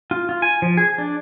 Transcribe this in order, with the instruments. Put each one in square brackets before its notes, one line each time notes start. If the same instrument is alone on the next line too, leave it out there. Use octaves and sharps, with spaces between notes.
[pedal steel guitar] F4
F4
G#5
F3
G#4
D4